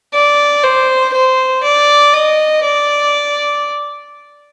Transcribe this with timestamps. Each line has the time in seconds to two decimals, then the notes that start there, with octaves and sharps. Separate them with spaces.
0.14 D5
0.64 C5
1.14 C5
1.64 D5
2.14 D#5
2.64 D5